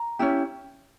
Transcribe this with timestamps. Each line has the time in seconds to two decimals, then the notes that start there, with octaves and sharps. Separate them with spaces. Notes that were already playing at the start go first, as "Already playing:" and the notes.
Already playing: A#5
0.19 C#4 E4 G4